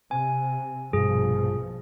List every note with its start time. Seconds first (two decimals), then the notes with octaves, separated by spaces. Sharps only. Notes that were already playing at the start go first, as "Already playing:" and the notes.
0.11 C3 G#5
0.93 A#1 G2 B2 F3 G#4